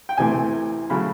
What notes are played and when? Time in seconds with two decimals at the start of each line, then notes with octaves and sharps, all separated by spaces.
0.09 G5
0.17 D2 C3 E3 A3 G#5
0.90 C#3 F#3 A3 B5